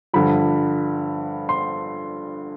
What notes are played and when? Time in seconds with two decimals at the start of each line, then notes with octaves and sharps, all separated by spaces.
0.14 G2 D3 F3 B5
1.49 C6